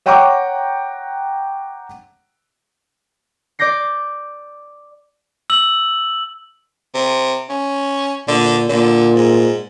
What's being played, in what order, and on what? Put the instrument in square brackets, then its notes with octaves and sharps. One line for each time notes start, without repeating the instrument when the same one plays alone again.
[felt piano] C#5 F#5 G5 A#5 C#6 D6
[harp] D5 D6 G6 A#6 C7
[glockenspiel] E6 F#7
[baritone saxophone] C3
C#4
[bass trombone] A#2 [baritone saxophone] D3
[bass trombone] A#2 [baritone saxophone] D3
[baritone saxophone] G#2